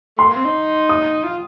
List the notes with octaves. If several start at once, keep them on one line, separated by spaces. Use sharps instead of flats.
A3 C6
A#3
C4
D#4
D#6
F4